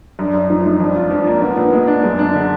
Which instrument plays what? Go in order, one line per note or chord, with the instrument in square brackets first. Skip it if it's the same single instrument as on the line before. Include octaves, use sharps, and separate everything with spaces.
[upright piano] F#2 [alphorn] D4
[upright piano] F#2
[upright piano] F3 [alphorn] D#4
[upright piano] G#3
[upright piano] F2 [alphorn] D4
[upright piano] F4
F3
A#3
[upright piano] A#2 [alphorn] B3
[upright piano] A#2
G#3
D4
[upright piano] F#2 [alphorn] G#3
[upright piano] D4
D3